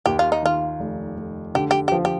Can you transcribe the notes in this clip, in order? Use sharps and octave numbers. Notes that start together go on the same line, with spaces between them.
D#2 G4
F4
D#4
D#3 F4
F1
F1
D3 G4
G4
G4
F3
G4